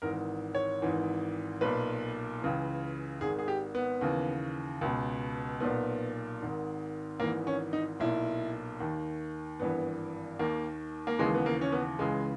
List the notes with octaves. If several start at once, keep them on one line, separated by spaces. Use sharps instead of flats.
G#1 G#2 E3 A#4
C#5
G#1 G#2 E3
B1 A#2 B4
C#2 C#3 E3
G#1 G#2 D#3 G#4
G#4
G4
B3
D#2 C#3 E3
C#2 B2
B1 A#2 B3
G#1 G#2 D#3
G#1 G#2 E3 A#3
C#4
D#4
B1 A#2 E4
D#2 D#3
G#1 G2 E3 B3
D#2 D#3 A#3
A#3
D#2 C#3 E3 G#3
B3
A#3
C#4
B3
C#2 C#3 E3 G#3